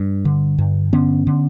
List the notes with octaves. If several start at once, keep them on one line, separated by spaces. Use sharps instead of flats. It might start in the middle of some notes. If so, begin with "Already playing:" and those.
Already playing: G2
D3
G2
D3 B3 C#4
D3